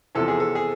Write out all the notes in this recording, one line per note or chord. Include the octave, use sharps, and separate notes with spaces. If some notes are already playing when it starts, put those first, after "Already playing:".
E2 C3 F3 A4
G#4
A4
G#4